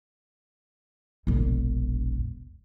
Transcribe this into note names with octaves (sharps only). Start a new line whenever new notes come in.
E1 A#1